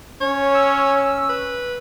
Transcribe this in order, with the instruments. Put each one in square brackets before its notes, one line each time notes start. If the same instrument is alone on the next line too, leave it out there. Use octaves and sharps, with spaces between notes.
[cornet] C#4 [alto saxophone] C#5
[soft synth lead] E6
[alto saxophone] B4